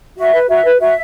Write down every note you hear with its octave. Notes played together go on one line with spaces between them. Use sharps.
F#4 E5
B4
F#4 E5
B4
F#4 E5